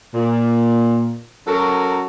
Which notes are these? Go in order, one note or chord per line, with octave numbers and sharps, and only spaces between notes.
A#2
F#3 C#4 F#4 A4 A#4